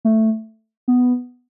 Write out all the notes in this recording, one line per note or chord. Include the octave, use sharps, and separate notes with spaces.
A3
B3